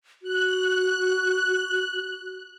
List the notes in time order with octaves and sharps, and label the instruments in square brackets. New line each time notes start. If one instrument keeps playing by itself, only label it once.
[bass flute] F#4 [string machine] F#6